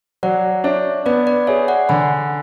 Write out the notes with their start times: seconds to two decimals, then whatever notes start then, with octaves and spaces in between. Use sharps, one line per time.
0.23 F#3 D5 F#5
0.64 D4 C#5 E5
1.06 B3 B4 D5
1.27 B4 D5
1.47 G#4 C#5 E5
1.68 D5 F#5
1.89 D3 G#5 B5